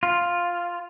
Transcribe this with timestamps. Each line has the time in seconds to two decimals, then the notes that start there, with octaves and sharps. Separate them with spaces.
0.03 F4